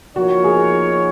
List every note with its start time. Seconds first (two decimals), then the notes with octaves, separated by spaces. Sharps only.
0.15 F3 A#3 D#4 F#4 A#4 C#5
0.44 G#4